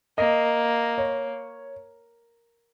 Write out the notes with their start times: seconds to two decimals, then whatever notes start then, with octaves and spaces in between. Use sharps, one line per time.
0.18 A#3 D#5
0.98 C#5